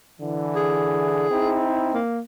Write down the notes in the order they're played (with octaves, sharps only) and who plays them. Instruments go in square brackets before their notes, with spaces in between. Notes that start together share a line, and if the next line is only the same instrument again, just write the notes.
[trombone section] D3 E3
[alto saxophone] G#4
[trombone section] C4 D#4 E4
[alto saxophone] A#3